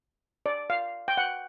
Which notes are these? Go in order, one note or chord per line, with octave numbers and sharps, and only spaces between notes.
D5
F5
G5
F#5